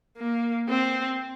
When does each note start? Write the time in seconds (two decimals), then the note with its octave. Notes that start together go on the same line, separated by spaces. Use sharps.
0.17 A#3
0.68 C4